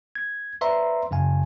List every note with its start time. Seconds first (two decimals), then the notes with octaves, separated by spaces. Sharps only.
0.15 G#6
0.61 B4 C5 D5 E5 A#5 C6
1.11 F#2 C#3 F5 G#5